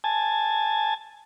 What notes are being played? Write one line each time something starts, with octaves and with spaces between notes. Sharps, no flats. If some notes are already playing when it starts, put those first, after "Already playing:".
G#5 A5